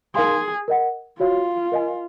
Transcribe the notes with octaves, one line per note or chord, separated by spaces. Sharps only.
D#4 G#4 A#4 F5 C6
A#4 D#5 F#5
F4 F#4 C#5 F5
A#4 D#5 G#5